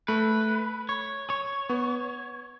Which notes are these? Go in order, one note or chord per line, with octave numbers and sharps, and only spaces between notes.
A3 B4
C#5
C#5
B3